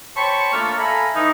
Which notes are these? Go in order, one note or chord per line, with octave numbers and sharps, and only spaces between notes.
C5 C#5 G5 A5 B5 C#6
A3 A#3 D4 F4 A4 A#4
A4 E5 F5 G#5 A#5 B5
E3 D#4